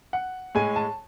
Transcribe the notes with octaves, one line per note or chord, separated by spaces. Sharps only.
F#5
A2 G#3 G#5
A5